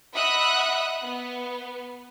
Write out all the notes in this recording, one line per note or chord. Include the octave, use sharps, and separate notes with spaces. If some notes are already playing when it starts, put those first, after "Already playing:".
D#5 E5 F#5 B5 D#6 F#6
B3